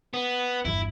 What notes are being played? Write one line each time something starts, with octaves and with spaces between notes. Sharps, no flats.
B3
G1 E2 E4